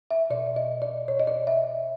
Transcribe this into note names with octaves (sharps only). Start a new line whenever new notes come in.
E5
B2 D5
D#5
D5
B2 C#5
D#5
D5
E5